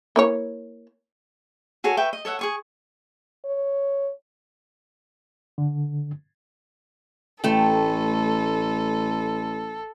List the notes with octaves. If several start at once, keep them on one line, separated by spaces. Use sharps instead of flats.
A#3 E4 C#5
F#4 G#4 A4 C#5
B4 E5 G5 C#6
D#5
A4 C#5 E5 F#5
G#4 C#6 D#6
C#5
D3
A1 A3 A4 G5